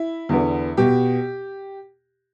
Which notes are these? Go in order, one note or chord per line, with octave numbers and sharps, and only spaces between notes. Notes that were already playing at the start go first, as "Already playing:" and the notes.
Already playing: E4
E2 D3 B3
B2 B3 G4